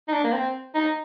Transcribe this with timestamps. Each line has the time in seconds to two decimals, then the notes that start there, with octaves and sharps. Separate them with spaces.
0.08 D#4
0.13 D4
0.24 A#3
0.33 C4
0.75 D#4